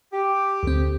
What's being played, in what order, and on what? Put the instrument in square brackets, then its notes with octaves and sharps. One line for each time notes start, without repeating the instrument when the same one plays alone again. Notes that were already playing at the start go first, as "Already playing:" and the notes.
[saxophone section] G4
[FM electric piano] D2 C4